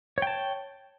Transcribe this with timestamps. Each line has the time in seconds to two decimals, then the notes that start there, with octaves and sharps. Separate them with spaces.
0.18 C#5
0.22 G5
0.27 A5